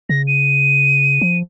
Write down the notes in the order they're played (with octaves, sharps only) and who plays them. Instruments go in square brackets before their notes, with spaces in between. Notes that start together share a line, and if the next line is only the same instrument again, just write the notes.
[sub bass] C#3 [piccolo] A#6
[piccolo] D#7
[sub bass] F3